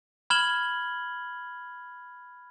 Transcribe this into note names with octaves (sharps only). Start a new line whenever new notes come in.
B5 F6 G#6 E7 F#7 G7